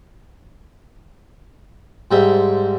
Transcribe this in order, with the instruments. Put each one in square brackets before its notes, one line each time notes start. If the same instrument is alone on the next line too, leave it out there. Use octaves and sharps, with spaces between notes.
[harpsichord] G#2 G3 C4 E5